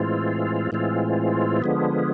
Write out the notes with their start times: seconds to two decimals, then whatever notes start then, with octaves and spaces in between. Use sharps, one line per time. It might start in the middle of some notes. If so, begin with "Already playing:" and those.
Already playing: A2 E3 G#3 C4 F4
0.72 A2 E3 G#3 C4 F4
1.62 D3 F3 G#3 B3